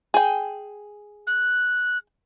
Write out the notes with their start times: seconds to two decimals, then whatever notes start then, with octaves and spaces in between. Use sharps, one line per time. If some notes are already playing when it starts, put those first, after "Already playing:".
0.14 G#4 G5
1.27 F#6